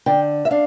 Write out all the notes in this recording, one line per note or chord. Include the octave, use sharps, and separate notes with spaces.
D3 G5
E5
D4 F5